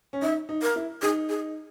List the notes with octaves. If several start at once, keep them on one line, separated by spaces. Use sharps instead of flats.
C#4
D#4 E5
D#4
A#4
E4
D#4 G#4
G#4